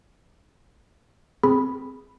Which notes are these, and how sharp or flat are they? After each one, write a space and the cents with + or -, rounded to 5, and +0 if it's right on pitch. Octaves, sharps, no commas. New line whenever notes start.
C4 -5 G#4 -5 B5 +0